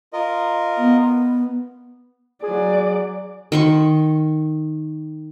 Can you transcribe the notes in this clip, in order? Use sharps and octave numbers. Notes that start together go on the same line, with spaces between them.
F4 A#4 D#5
B3
F#3 G#4 D5
D#3 C6 C#6